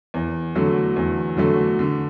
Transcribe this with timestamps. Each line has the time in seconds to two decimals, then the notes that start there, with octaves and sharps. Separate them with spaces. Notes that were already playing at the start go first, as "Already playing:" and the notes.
0.14 E2
0.55 D3 F#3 A3
0.96 E2
1.37 D3 F#3 A3
1.79 D3